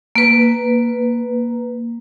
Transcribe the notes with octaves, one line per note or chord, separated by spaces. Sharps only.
A#3 B4